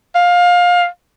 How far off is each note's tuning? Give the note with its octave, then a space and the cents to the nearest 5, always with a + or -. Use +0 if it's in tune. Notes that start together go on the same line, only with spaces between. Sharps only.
F5 +20